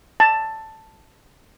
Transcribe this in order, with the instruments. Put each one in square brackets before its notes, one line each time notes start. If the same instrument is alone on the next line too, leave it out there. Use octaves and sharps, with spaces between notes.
[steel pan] A5